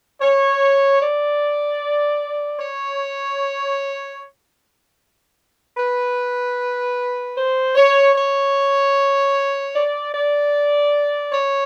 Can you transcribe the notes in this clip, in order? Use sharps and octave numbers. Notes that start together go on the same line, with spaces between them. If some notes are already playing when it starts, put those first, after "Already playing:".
C#5
D5
C#5
B4
C5
C#5
C#5
D5
D5
C#5